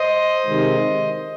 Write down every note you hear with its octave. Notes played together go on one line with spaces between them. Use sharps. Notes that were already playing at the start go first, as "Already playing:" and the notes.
Already playing: C5 D#5
C3 D#3 G#3